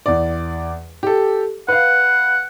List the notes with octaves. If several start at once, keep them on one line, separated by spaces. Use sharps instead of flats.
E2 D5
G4 A4
B4 F5 F#5